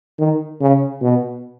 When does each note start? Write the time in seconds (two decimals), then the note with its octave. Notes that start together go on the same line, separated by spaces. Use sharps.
0.19 D#3
0.61 C#3
1.02 B2